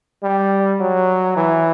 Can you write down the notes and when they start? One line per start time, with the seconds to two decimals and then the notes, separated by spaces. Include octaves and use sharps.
0.23 G3
0.80 F#3
1.36 E3